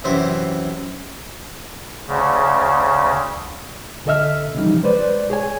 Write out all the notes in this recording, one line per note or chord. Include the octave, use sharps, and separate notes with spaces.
F#2 C3 E3 C5 E5
D2 C#3
C#2 D3 A4 D#5 E5 F6
C#3 E3 F3 G3 D#4
G#3 B4 C5 D5
G#4 C#5 G#5